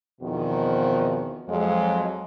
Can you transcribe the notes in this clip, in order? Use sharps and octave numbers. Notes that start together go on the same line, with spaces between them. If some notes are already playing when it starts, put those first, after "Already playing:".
E2 B2 D#3 F3 C4 F#4
F2 F#3 G#3